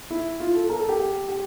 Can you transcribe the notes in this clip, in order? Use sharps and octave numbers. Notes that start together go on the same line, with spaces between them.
E4
F4
A4
A#4
A4
G4
G4
G4